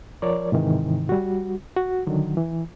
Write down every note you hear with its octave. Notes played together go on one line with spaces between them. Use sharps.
F3 A#4 C#5 D5
G#2 C3 D#3 E3
G3 F#4
F#4
D3 D#3 F#3
E3